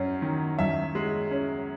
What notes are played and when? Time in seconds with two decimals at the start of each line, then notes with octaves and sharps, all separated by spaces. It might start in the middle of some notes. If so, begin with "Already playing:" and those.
Already playing: F#2 C#4
0.22 D#3
0.59 F#2 E5
0.95 G#3
1.31 C#4